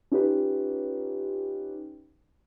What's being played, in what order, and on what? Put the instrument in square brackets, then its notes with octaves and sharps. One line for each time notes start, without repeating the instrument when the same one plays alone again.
[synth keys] C#4 D#4 F4 G4 B4